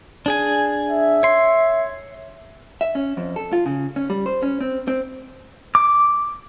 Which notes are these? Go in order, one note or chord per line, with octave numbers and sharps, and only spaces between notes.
D4 G#4 G#5
E5
C#5 C6
E5
C#4
F2
A4
F4
C#3
C#4
G3
C5
C#4
C4
C4
D6